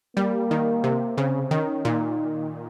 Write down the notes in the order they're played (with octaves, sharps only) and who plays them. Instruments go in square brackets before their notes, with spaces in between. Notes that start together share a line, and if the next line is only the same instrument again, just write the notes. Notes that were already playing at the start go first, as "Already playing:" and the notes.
[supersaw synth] G3 [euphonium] A#3
[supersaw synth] D#3
C3
[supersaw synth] C#3 [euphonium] C4
[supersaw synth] D#3 [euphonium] C#4
[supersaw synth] A#2 [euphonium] D#4